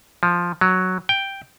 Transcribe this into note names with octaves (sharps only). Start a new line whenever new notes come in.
F3
F#3
G5